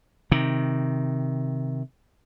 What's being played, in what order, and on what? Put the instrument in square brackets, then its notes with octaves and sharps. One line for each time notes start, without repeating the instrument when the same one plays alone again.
[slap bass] C3 D#3